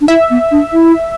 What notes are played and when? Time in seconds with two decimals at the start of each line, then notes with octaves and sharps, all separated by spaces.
0.01 D4
0.08 E4 E5
0.30 B3
0.51 D4
0.73 E4